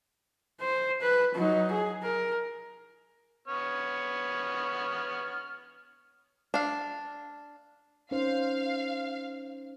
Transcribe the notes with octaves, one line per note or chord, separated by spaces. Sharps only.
C5
B4
F#3 D#4
G#4
A#4
B3 C#5 F6
D4 F5
C#4 D#4 C5 F5